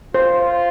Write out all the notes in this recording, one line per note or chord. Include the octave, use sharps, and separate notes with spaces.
F4 C5